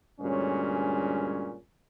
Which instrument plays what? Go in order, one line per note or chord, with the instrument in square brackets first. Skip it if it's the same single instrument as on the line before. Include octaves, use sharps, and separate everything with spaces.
[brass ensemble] D2 G2 A#2 G#3 C#4